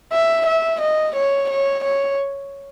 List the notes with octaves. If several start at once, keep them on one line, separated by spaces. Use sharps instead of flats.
E5
E5
D#5
C#5
C#5
C#5